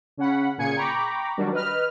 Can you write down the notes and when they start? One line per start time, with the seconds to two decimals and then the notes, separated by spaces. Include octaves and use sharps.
0.17 C#3 C#4 F#5 B5
0.58 A#2 C#3 G#4 G#5 G#6 C#7
0.76 G5 A#5 B5 C#6 D6
1.37 D#3 F#3 G3 D4 F#4 A#4
1.53 B4 D#5 F6